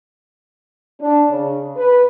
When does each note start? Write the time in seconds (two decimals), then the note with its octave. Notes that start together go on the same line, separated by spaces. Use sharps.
1.01 D4
1.29 C#3
1.77 B4